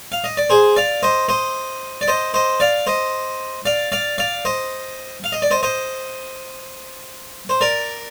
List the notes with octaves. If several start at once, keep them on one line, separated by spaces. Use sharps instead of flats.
F5
D#5
D5
G#4 C5
D5 F5
C5 D#5
C5 D#5
D5
C5 D#5
C5 D#5
D5 F5
C5 D#5
D5 F5
D5 F5
D5 F5
C5 D#5
F5
D#5
D5
C5 D#5
C5 D#5
C5
A#4 D5